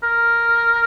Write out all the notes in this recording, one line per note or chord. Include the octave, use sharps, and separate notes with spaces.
A#4